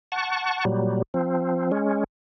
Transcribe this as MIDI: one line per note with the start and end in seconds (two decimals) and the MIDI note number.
0.12 0.65 78
0.12 0.65 81
0.12 0.65 85
0.65 1.02 46
0.65 1.02 54
0.65 1.02 55
1.14 1.72 53
1.14 1.72 60
1.72 2.04 56
1.72 2.04 61